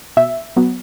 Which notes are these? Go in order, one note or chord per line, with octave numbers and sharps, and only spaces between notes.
B2 E5
F#3 B3